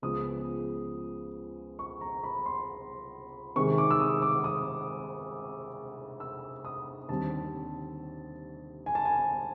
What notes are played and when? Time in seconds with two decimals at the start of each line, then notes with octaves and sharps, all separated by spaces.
0.02 C#2 C#3 F3 G#3 B3 D#6
1.79 C#6
2.01 A#5
2.24 B5
2.46 C6
3.56 C3 D#3 G#3 C#6
3.78 D6
3.91 E6
4.00 D#6
4.22 D6
4.44 D#6
6.20 E6
6.65 D#6
7.09 D#2 D3 G3 C4 A5
8.86 G#5
8.95 A5
9.05 G#5